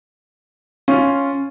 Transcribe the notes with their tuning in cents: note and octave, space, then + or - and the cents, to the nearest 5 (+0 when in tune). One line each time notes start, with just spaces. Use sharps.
C#4 +0 F4 +0